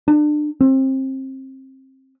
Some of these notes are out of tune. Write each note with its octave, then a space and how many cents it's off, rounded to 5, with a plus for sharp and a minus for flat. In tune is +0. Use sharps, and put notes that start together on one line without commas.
D4 +30
C4 +25